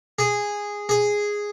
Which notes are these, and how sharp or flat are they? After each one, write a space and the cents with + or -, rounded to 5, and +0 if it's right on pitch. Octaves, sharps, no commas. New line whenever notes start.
G#4 -10
G#4 -5